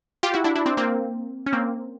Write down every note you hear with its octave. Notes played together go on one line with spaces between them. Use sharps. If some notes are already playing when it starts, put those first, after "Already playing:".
F4 G4
E4 F#4
D4 E4
D4 E4
C4 D4
A#3 C4
C#4
A#3 C4